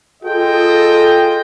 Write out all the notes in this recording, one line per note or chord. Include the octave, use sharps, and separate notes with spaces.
F4 G#4 A4 D#5 G5